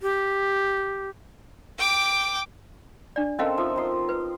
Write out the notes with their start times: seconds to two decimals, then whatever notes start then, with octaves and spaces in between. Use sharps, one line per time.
0.02 G4
1.79 G5 D6
3.16 D4 D5
3.39 C4 C#4 A4 A#4 D#5 F5
3.57 F3 D#4 E5
3.76 A#5 C6 D#6
4.09 B4